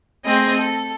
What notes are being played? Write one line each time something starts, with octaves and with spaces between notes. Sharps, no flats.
A3 C4 G#4 D#5
A4